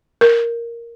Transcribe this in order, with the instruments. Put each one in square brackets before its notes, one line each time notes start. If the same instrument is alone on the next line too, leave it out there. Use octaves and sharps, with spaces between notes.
[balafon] A#4